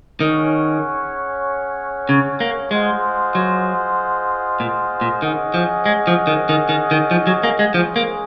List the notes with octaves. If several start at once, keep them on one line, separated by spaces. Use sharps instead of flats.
D#3 C#4 G#4 C#5 F#5
C#3
A#3
G#3 F4 G#4 C5 D#5 F#5
F#3
A#2
A#2
D#3 C#4 G#4 D#5 F#5
F3
G#3
F3
D#3
D#3
D#3
D#3
F3
F#3
A#3
G#3
F3 G#3 C#4 G#4
A#3